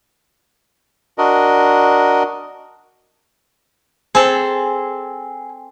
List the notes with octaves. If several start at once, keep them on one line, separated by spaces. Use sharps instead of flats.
D4 F#4 A#4 D#5
C4 G#4 A4